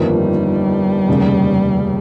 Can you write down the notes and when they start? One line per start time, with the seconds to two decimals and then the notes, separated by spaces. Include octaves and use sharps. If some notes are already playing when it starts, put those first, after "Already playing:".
Already playing: G1 F2 D#3 G3 A#3
1.08 F1 D#2 C#3